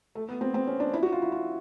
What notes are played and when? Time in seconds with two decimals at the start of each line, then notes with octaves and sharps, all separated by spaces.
0.15 A3
0.29 B3
0.41 C4
0.54 C4
0.67 C#4
0.80 D4
0.93 E4
1.03 F#4
1.12 F4
1.22 E4
1.32 F4